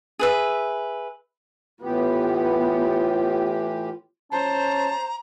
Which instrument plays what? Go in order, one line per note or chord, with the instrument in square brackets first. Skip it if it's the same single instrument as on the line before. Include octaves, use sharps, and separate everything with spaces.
[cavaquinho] G#4 B4 E5
[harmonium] A2 E3 G4 [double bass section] B3 [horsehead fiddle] F4
[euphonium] C#4 [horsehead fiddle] C5 [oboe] A5 [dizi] A#5